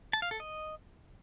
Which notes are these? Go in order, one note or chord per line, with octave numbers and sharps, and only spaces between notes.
A5
F5
A4
D#5